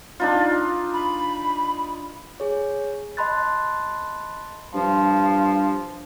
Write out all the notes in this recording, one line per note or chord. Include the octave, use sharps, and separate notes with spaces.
D4 D#4 F4
B5
G#4 C#5
D#5 A5 B5 C6 F#6 A6
G2 F3